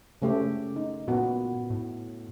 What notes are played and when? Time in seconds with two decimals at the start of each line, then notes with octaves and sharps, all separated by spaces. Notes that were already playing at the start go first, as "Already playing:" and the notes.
0.22 C#3 A3 G4
0.76 D#4
1.08 A#2 B3 F#4
1.70 A2